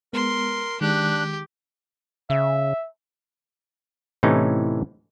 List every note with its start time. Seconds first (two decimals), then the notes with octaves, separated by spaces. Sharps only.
0.13 G#3 B3 A#4 C6
0.81 D#3 G#3 D4 G4 F#6
2.30 C#3 E5
4.23 A2 C3 E3 C#4 D#4